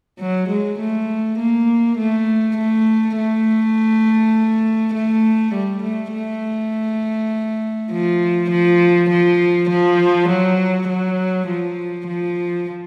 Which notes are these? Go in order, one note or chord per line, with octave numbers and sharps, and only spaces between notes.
F#3
G#3
A3
A#3
A3
A3
A3
A3
G3
A3
A3
F3
F3
F3
F3
F#3
F#3
F3
F3